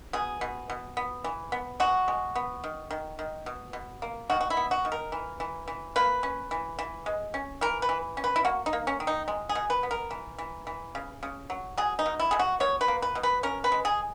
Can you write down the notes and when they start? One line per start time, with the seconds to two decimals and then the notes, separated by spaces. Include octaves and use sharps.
0.13 B2 G#4
0.41 B2
0.70 B2
0.97 B3
1.24 E3
1.52 B3
1.80 G#3 F#4
2.08 G#3
2.35 B3
2.64 D#3
2.91 D#3
3.19 D#3
3.46 B2
3.73 B2
4.02 A#3
4.30 D#3 F#4
4.41 F#4
4.50 E4
4.57 B3
4.71 F#4
4.85 D#3
4.92 A#4
5.12 E3
5.40 E3
5.68 E3
5.96 A#3 B4
6.23 C#4
6.51 E3
6.79 E3
7.06 G#3
7.34 C#4
7.61 E3 A#4
7.82 B4
7.89 E3
8.17 C#4
8.24 B4
8.36 E4
8.45 A#3 F#4
8.66 D#4
8.73 A#3
8.87 C#4
9.00 D#3
9.07 D#4
9.28 G#3
9.49 G#4
9.55 B2
9.70 B4
9.83 B3
9.91 A#4
10.11 E3
10.38 E3
10.67 E3
10.95 C#3
11.23 C#3
11.50 F#3
11.77 F#3 G#4
11.99 D#4
12.06 B2
12.20 E4
12.31 B2 G#4
12.39 F#4
12.60 B2 C#5
12.81 B4
12.88 A#3
13.02 B4
13.15 B2
13.23 B4
13.43 C#4 A#4
13.64 B4
13.72 G#3
13.85 G#4